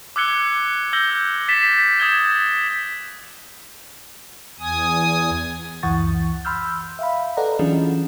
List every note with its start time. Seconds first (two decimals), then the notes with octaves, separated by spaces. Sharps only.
0.16 D6 E6 F#6 G#6 C#7 G7
0.93 E6 G6 A#6 F#7 G7
1.48 A6 B6 E7
2.00 D#6 G6 G#6 E7 G7
4.60 E2 G#5 D#6
5.83 C#2 F#2 E3 F#5 C#6 A6
6.45 B5 C6 E6 F6 G6
6.99 E5 F5 B5
7.37 A4 B4 D5 D#5 F#5 A#5
7.59 E3 F#3 C#4 D4 F4 G#4